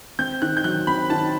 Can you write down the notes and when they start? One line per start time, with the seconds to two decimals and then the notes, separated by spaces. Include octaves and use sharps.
0.19 C4 G6
0.42 D#3 F#6
0.57 G6
0.64 F#3 F#6
0.87 C4 B5
1.10 D#3 A5